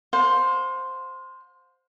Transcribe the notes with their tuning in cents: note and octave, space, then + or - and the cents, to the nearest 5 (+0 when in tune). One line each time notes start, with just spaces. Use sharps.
C5 +0 F5 +40